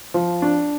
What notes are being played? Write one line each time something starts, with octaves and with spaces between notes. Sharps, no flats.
F3
D4